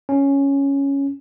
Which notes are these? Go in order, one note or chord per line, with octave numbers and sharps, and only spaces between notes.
C#4